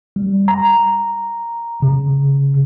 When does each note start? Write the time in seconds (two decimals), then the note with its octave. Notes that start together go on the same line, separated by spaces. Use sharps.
0.16 G3
0.48 A#5
1.82 C#3